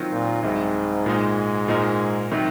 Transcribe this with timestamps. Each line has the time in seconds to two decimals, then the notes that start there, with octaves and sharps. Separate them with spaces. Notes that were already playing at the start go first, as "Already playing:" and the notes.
Already playing: D#3 F#3 C4 F4
0.12 A#2
0.43 C2 G#2 C3 F#3
1.06 A#2 G#3 D#4
1.68 A#2 G#3 D#4 A#4
2.32 C3 D#3 F#3